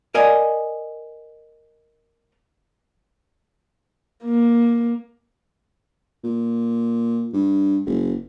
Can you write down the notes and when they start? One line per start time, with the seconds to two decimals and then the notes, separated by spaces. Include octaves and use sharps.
0.15 A#4 D5 D#5 F5 G#5
4.24 A#3
6.24 A#2
7.33 G2
7.86 F#1